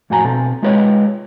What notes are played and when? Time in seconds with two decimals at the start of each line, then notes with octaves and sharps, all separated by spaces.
0.10 F2 A2 F#4 F#5 G#5 A#5
0.24 B2 C4 A4
0.62 G#3 F4 G4 B4 C#5 D#5